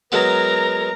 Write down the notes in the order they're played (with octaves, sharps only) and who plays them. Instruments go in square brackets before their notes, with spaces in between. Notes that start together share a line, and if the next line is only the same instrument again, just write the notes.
[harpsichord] F#3 G#3 B3 [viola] A#4 A#5 [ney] B4